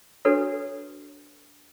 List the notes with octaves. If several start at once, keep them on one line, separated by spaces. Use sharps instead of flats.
D4 F#4 A4 B4 C#5